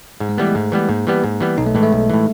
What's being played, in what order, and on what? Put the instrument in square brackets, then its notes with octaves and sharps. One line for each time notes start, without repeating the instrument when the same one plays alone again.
[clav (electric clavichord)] G#2
[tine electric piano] G#3
[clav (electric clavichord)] E3 G3 B3 [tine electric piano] A3
[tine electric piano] G#3
[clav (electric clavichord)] G#2 [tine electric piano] A3
[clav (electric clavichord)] E3 G3 B3
[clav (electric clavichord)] G#2 [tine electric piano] A#3
[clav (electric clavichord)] E3 G3 B3
G#2
E3 G3 B3
[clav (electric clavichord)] B1 [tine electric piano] D#4
[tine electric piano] A3
[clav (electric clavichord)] A2 E3 [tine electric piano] G#3
[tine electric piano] A3
[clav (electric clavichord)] B1
A2 E3